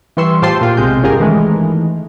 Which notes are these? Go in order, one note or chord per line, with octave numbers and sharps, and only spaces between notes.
E3 G3 B4 C6 C#6 E6
A2 F4 G4 C5 A5 C6
A#2 F4 G4
B1 C3 G#3 C4 G6
G1 C#4 F4 G4 G#4 A#4
D#3 E3 G#3 A3